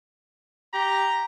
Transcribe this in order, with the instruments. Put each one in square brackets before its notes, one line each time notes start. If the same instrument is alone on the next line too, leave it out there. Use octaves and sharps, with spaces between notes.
[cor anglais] G4 [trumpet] A#5